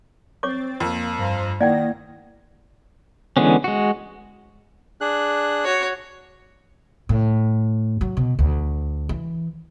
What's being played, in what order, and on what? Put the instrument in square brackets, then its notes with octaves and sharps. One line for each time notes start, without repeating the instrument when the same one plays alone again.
[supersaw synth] C4 A6 [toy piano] C#5 C#6 D6
[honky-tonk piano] F2 [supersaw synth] A#3
[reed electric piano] G2 [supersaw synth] C5 F5 A#5
[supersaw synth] D#3 A#6 [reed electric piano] A#3 E4 G#6 [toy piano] D5 F#5 G5
[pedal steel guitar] D3 E3 G#3 B3 C#4
G#3 F#4
[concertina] D4 G#4 F#6
[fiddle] F#4 C#5
[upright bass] A2
F#3
B2
D2
E3